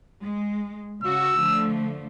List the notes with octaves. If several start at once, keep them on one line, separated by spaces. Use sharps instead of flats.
G#3
C#3 F#4 E6
D3 F3 A3